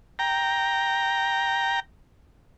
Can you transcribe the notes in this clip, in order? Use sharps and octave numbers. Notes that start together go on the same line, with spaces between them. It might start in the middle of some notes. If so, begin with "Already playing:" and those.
G5 A#5